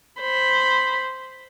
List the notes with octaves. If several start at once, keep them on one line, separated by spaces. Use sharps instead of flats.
C5 B5